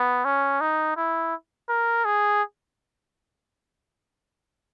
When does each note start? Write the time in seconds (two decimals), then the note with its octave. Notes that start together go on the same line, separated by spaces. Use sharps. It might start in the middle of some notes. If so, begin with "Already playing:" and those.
Already playing: B3
0.25 C#4
0.61 D#4
0.97 E4
1.69 A#4
2.05 G#4